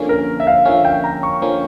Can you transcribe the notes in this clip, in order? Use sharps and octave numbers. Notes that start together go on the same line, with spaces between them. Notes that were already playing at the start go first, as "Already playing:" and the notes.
Already playing: D3 F3 A#3 C#4
A#4
E5
F5
D3 F3 A#3 C#4 F5
G5
A#5
C#6
D3 F3 A#3 C#4